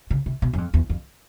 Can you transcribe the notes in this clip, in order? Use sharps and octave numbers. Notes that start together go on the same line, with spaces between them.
C#3
C3
B2
F#2
F2
E2
F2